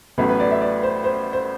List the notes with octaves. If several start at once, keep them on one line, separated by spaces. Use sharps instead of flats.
A1 A2 F#3 B3 B4
B4
D5
E5
D5
C5
C5
C5